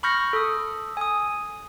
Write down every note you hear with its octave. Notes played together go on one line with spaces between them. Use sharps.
B5 C#6 F6 G6 A#6 C#7
A4 D#6
G#5 D#6